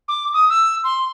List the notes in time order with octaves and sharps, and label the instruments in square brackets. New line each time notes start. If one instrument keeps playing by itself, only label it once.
[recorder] D6
D#6
E6
C6